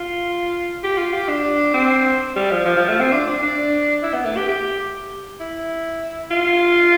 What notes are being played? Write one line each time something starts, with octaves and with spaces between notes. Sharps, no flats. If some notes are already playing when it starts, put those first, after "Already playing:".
Already playing: F4
G4
F4
G4
D4
C4
G3
F3
F3
F3
A3
C4
D4
D4
D4
E4
B3
A3
G4
G4
E4
F4